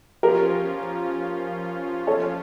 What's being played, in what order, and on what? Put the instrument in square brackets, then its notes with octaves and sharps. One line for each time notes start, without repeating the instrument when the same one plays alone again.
[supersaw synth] F3 C#4 F4 [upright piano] G4 A#4
[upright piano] A4 C#5